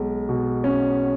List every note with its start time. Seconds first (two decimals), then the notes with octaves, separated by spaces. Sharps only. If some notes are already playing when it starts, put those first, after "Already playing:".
Already playing: B1 G#3
0.29 B2
0.64 C#4